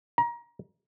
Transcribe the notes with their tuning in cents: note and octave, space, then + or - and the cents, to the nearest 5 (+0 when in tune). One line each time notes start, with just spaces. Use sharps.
A#5 +25